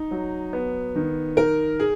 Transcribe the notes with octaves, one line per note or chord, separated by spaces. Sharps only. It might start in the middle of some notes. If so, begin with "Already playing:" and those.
Already playing: D#4
F#3
B3
D#3
D#4 A#4
G#4